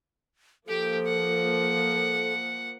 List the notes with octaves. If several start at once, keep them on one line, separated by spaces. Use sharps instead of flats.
F3 A#3 G4 A4 G5
F#5